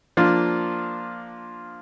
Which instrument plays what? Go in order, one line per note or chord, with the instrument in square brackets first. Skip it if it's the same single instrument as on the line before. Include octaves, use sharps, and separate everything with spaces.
[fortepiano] F3 A#3 D4 F4